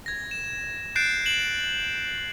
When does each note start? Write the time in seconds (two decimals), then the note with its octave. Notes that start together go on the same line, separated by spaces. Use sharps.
0.06 G#6 A#6
0.31 E7
0.96 F#6 G6 A6 C7 D7 E7
1.26 E7 F#7